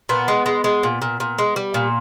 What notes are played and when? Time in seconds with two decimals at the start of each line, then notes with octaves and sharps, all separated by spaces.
0.09 A#2 B3
0.28 G#3
0.46 G#3
0.64 G#3
0.83 A#2
1.02 A#2
1.20 A#2
1.38 G#3
1.56 G3
1.74 A#2